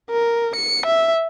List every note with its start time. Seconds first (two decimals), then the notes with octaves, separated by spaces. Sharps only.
0.10 A#4
0.56 C#7
0.86 E5